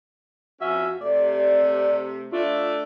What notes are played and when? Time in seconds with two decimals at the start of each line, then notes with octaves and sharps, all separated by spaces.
0.60 F2 C#4 F#4 E5
1.01 C3 A3 D5
2.32 A3 D4 F4